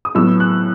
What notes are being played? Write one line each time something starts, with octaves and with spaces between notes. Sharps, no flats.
D#6
A2 F#3 B3 E6
F#6